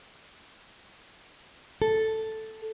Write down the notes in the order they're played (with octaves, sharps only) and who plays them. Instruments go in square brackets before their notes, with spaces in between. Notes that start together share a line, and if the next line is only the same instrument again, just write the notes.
[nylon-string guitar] A4